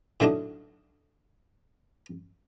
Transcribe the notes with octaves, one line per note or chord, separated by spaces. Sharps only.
A2 D3 F#3 D4 D#4